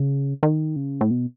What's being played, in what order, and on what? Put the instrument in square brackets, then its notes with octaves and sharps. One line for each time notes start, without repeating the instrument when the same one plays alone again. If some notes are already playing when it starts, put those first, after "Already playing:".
Already playing: [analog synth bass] C#3
D#3
C#3
A2
B2